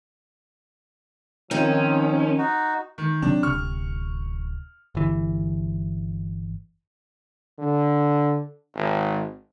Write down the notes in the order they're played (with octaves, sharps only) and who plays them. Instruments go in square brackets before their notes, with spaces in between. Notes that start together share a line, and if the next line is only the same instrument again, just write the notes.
[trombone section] D#3 F3 [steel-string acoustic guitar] C4 D#4 [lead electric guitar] C#4
[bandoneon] D#4 F#4
[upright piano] D#3
[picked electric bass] C3 F#3 C4 [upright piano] D4
[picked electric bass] D1 C3 [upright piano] C#6 F6
[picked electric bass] G1 E3
[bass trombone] D3
G#1